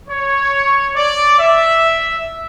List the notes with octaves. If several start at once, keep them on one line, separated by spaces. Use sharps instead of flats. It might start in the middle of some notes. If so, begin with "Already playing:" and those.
C#5
D5
E5